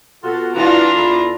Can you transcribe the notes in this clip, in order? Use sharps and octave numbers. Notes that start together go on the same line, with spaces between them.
B2 F4 F#4 A4
E3 D4 F4 F#4 A#5
E2 E4 A4